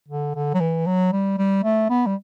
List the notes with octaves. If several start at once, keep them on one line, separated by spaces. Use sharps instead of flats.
D3
D3
F#3
E3
F#3
G3
G3
A3
B3
G3